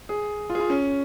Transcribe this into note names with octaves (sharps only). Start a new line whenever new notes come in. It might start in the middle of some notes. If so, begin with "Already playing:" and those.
G#4
F4
G#4
F4
C#4